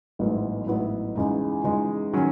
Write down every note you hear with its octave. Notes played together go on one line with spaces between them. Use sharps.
A1 G#2 F#3 B3 E4
A1 G#2 F#3 B3 E4
E2 C#3 G#3 D#4
E2 C#3 G#3 D#4
D#3 F#3 C#4